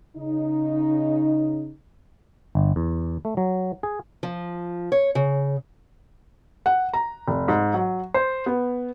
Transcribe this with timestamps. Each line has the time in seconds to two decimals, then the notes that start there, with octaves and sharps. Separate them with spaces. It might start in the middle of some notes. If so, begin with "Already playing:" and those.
0.16 C#3 D#4
2.55 G1
2.76 E2
3.25 A3
3.37 F#3
3.83 G#4
4.23 F3
4.92 C#5
5.15 C#3
6.66 F#5
6.93 A#5
7.28 F1
7.48 G#2
7.74 F#3
8.14 C5
8.46 B3